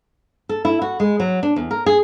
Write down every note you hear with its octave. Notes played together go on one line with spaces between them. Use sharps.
A4
E4
F#4
G#3
F#3
D4
E2
A#4
G#4